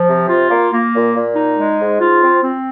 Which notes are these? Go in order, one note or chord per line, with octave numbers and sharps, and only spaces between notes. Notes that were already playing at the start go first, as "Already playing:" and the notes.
Already playing: F3
C3
F4
A#3
A#3
A#2
A#2
D#4
G#3
G#2
F4
C4
C4